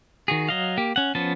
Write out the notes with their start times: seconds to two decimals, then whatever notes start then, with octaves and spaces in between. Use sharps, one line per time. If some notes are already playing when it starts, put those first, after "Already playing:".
0.28 D#3 F#4 G#4
0.49 F#3 D#5 F5
0.77 A#3 G4
0.96 C#4 F#5
1.15 F3 B3 C#4 A5